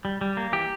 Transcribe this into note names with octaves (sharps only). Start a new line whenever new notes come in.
G3
G3
A#3
E3 G4